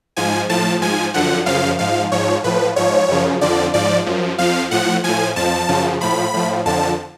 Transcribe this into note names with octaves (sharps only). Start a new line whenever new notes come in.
G#2 F3 G#5
A2 F3 A5
G#2 F3 G#5
F#2 D3 F3 F#5
F#2 C#3 F3 F5
G#2 F3 F5
G#2 F3 C#5
A2 F3 B4
G#2 F3 C#5
F#2 C#3 F3
F2 D3 F3 D5
G#2 F3 D5
F#2 F3
F2 F3 F5
A2 F3 F#5
A2 F3 G#5
F2 F3 A5
F#2 C#3 F3
A2 F3 B5
A2 F3
F2 D3 F3 A5